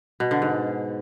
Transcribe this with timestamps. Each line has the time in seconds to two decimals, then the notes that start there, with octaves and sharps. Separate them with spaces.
0.20 B2
0.31 D3
0.42 G#2